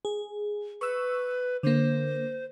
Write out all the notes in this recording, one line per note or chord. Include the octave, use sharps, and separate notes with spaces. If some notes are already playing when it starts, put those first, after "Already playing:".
G#4
B4 C#6 E6
D3 A#3 C5